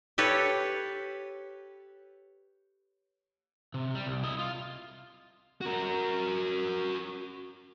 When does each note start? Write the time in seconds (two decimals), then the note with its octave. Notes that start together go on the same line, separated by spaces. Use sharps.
0.18 G4 A4 B4 C#5
3.74 C3
3.95 G3
4.06 C2
4.23 E4 D#5
4.39 F4
5.62 F#4 A#4